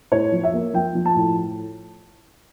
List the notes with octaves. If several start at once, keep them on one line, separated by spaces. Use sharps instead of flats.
A2 C#5
F3
E5
A#3
F3 G5
F3
A5
A2